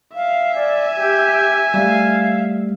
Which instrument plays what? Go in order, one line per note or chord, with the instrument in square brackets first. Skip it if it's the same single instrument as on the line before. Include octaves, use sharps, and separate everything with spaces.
[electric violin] E5 [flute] F5
[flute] D5 [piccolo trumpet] G#5
[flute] G4
[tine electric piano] G3 A3 [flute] F5